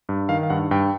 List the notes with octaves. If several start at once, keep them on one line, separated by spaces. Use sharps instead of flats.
G2
D#3 F5
F5
G2 F#5
G2 G5